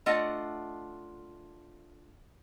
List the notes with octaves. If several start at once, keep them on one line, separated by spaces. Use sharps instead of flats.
A3 D4 F4 D#5 F#5